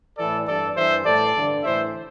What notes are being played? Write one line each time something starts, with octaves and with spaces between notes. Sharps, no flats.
A2 E3 A4 D5
G2 E3 A4 D5
G2 E3 C5 E5
A2 E3 A4 D5
G2 D3
A2 E3 C5 E5